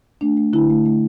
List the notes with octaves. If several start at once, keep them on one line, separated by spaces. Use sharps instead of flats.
A3 D4
A3
D3 E4
A3
A3